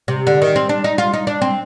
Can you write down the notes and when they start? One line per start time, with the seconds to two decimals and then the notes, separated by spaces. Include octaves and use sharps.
0.08 C3
0.27 D3
0.42 D#3
0.56 C4
0.69 D4
0.84 D#4
0.98 F4
1.13 D#4
1.27 D4
1.42 C4